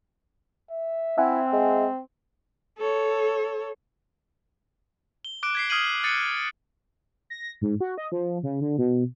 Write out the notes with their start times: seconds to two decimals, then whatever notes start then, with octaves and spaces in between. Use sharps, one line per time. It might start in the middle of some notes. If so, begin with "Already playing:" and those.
0.70 E5
1.18 C4 E4 E5 F#5 G#5
1.53 G#3
2.78 A4 C#5
5.25 G7
5.43 D6 F#6 D7
5.55 G#6 B6 C7
5.70 D#6 F6 G#6 C7 D#7 F#7
6.04 D#6 F#6 A6 C#7 D#7
7.30 A#6
7.61 G#2
7.80 F#4
7.98 D#5
8.12 F3
8.43 C#3
8.61 D3
8.78 B2